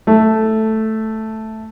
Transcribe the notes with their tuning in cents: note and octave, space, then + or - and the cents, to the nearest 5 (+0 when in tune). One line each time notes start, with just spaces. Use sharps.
A3 +0